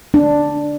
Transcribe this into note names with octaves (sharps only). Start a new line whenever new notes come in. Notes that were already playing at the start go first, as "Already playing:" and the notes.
D4